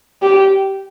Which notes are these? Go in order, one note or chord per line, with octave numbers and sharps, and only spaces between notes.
G4